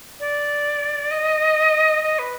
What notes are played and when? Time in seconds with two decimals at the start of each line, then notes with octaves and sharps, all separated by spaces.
0.20 D5
1.11 D#5
2.03 D#5
2.19 B4